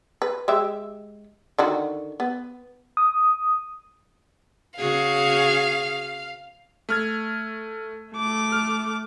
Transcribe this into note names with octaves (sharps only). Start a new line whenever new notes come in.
B4
G#3 G4 E5
D3 D#3 F#4
B3
D#6
C#3 F#4 G#4 F5
A3 F6 G#6
A3 D6
F6